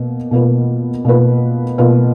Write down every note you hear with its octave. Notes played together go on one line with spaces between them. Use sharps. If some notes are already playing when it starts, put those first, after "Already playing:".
Already playing: B2 A#3
B2 A#3 F4 B4
B2 A#3 F4 B4
B2 A#3 F4 B4